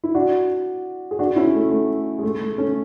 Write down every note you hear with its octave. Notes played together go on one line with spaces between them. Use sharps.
E4
D4 F#4
G#4
D4 F#4
C#4 E4
A3
A3
G#3
A3
A3
A3 C#4